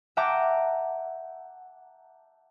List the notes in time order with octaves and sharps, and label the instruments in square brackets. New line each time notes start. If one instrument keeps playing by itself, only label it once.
[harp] E5 F#5 G5 A5 A#5 D6